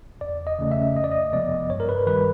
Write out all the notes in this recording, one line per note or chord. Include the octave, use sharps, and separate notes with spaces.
E2 D5
D#5
C#3 E3 A3 C#4
E5
F2 D#5
D5
D#5
C3 F3 G#3 B3 D5
G2 C#5
A#4
B4
D#3 G3 B4